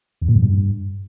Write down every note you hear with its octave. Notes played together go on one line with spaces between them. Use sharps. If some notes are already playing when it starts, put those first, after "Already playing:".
E2
A#2
F#2
G2